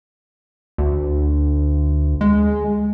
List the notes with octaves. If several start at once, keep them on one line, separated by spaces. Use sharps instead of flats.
D2
G#3